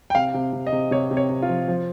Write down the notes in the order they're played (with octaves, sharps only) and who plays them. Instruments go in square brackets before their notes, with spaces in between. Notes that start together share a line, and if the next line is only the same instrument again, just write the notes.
[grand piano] G5
C3 F5
C3
C3
D#5
C3
C3 C#5
C3
C#5
C3
F4
F3
F3